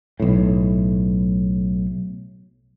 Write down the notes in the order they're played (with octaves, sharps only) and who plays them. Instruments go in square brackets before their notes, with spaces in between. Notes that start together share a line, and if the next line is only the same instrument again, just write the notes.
[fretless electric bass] B1 A2